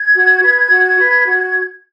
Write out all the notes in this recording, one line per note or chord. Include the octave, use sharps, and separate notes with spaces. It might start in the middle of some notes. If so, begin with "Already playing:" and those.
Already playing: G#6
F#4
B4
F#4
B4
F#4